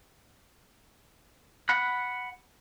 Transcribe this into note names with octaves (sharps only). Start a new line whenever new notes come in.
F#5 B5 F#6